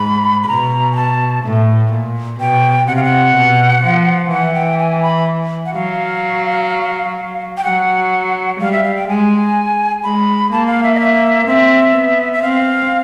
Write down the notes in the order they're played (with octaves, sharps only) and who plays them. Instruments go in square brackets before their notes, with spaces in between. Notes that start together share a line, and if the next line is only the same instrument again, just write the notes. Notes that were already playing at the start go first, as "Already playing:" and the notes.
Already playing: [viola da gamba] G#2 [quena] B5
[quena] B5
[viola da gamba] B2 [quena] A#5
[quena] G#5
A5
[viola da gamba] A2
A#2
[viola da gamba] B2 [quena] G5
[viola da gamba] C3 [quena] F#5
[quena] F5
F#5
[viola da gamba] B2
F3
[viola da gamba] E3 [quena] F#5
[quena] G5
G#5
B5
F#5
[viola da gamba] F#3 [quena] F5
[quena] G5
[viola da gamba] F#3 [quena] F#5
[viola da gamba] G3 [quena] F5
[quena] E5
F5
G5
[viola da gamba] G#3 [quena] G#5
[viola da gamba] G#3 [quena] B5
[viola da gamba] A#3 [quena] A5
[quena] F5
E5
D#5
E5
[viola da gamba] C4 [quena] E5
[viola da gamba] B3
[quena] E5
[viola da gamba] C4 [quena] F5